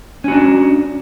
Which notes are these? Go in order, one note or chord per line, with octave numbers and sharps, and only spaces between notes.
C#4 D4 F#4